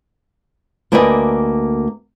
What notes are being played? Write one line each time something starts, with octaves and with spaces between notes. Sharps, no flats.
D2 A#3 B4 D5 D#5 G#5